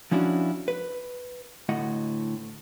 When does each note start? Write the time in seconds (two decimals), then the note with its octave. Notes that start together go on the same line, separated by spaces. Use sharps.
0.11 F3 C#4 D4 E4 F#4
0.68 B4
1.69 D2 A2 D#5 F#5